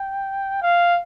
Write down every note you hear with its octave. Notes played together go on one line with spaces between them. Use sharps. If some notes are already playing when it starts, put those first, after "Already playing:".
Already playing: G5
F5